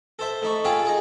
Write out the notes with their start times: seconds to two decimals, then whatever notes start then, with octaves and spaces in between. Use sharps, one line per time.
0.19 A4 C5 E5
0.42 A3 D#4 B5 C#6
0.65 F4 G#4 A4 F5 G5 B5
0.86 D#4 G#4